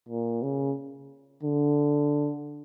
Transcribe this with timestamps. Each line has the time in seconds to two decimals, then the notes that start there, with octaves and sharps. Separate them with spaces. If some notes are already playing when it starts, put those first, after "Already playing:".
0.09 A#2
0.42 C#3
1.43 D3